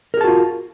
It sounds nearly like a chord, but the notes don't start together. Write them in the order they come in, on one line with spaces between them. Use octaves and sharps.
A#4 G#4 A5 F#4 F4